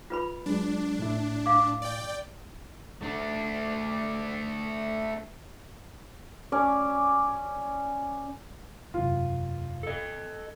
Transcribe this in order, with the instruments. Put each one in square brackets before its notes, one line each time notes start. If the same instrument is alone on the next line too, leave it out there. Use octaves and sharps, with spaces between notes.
[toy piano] F4 B4 B5
[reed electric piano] F#3 G#3 [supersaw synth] D4
[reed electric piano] A2 E4
[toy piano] F5 D6
[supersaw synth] D5 G5
[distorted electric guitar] A3 D4
[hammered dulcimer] C#4 D5
[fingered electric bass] E1 F#2 C3 [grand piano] F4
[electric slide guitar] A4 D#5